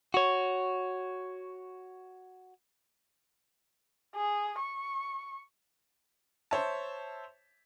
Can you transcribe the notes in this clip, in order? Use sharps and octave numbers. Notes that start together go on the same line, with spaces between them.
F#4 C#5
G#4
C#6
C5 C#5 E5 A5